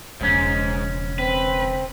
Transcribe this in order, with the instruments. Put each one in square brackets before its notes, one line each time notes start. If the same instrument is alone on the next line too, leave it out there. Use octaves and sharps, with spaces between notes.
[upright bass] E1 F3 [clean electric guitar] C#2 C#4 [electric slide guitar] G#2
[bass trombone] C4 [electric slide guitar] B4